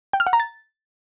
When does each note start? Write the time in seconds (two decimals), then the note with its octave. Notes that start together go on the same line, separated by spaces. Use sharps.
0.13 G5
0.20 F6
0.27 F#5
0.33 A#5
0.40 A6